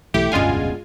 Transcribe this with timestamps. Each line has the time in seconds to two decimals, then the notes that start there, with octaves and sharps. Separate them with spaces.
0.14 B1 E3 A3 E4 G4
0.32 F1 D2 G2 B2 G#3 C#4 F4 G#5